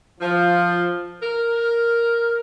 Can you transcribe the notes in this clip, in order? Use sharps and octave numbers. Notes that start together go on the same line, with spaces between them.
F3
A#4